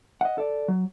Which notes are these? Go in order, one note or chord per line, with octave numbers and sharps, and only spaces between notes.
D#5 F#5
A4 D5
F#3